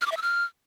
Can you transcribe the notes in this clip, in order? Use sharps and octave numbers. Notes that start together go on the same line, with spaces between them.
F6
D6
E5
E6
F6